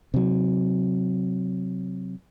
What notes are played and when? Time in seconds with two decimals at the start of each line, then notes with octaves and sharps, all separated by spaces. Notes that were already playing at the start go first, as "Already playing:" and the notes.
0.14 C3 F#3